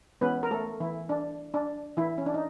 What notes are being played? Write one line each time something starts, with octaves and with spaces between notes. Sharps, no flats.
E3 G#3 B3 C#4 B4
A#4
A3 A4
E3 E4
D4
D4
E3 E4
C#4
D4
D#4